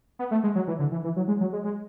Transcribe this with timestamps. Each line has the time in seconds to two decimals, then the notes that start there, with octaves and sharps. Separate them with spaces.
0.19 B3
0.31 A3
0.44 G#3
0.55 F#3
0.68 E3
0.79 D3
0.92 E3
1.04 E3
1.16 F#3
1.28 G#3
1.41 F#3
1.53 G#3
1.64 G#3